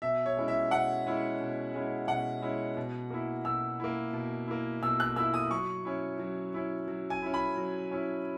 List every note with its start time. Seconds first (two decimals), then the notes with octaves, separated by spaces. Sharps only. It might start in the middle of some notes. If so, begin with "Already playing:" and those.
0.02 B2 E5
0.26 C#5
0.37 G#3 C#4 E4
0.48 E5
0.71 B2 F#5
1.06 G#3 C#4 E4
1.40 B2
1.74 G#3 C#4 E4
2.08 B2 F#5
2.42 G#3 C#4 E4
2.77 B2
3.10 A#3 E4
3.45 B2 E6
3.80 A#3 E4
4.13 B2
4.48 A#3 E4
4.83 B2 E6
5.00 F#6
5.16 A#3 E4 E6
5.34 D#6
5.51 F#3 C#6
5.85 C#4 E4
6.19 F#3
6.54 C#4 E4
6.88 F#3
7.10 G#5
7.23 C#4 E4
7.34 B5
7.57 F#3
7.91 C#4 E4